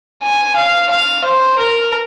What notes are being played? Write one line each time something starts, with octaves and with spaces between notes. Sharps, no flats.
G#5
F5
F5
C5
A#4